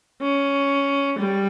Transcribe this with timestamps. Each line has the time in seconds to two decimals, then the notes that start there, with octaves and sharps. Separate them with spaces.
0.21 C#4
1.19 G3